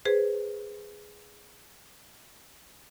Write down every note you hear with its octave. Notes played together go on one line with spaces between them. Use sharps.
G#4 B4 C5